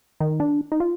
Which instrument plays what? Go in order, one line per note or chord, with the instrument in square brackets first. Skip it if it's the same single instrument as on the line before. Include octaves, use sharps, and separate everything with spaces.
[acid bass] D#3
D4
D#4
F4